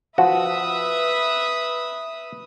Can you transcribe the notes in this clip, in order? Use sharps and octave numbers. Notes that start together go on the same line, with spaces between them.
F3 F#4 B4 E5 D#6